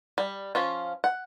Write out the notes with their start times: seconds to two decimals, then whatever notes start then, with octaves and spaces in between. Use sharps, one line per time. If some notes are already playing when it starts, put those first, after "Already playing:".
0.18 G3
0.55 F3 C#4 F4
1.04 F#5